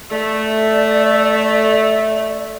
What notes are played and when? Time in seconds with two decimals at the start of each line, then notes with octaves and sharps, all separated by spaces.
0.11 A3 D5